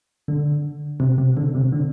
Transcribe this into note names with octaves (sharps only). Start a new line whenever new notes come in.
D3
C3
C3
D3
C3
D3